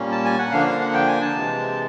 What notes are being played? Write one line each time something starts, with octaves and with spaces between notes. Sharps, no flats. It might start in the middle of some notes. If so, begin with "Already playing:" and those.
Already playing: A#2 G3 A#3 C#4
A5
G#5
F#5
D3 F3 A#3 D4 F5
F5
F#5
G5
G#5
A5
C3 E3 G#3